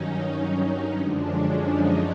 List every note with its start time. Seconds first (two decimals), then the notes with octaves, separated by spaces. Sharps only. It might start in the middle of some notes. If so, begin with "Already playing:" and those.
Already playing: G2 D#3 F#3 C#4 D#4
0.33 C#4 D#4
0.99 F#2 D3 F3 G#3 D4
1.31 C#4
1.64 C#4 D#4